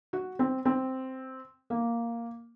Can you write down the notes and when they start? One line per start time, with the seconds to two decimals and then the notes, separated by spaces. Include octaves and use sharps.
0.13 F#4
0.39 C4
0.65 C4
1.70 A#3